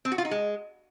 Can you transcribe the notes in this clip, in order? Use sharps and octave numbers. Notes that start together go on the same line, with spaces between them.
C4
F#4
F4
D#4
G#3